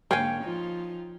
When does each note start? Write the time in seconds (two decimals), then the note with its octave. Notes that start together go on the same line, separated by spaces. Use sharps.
0.11 G#2 D3 A#3 A#4 C#5 F5 G5 G#5
0.43 F3 D#4 F4